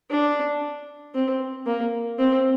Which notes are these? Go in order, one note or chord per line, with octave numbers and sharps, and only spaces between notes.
D4
C4
A#3
C4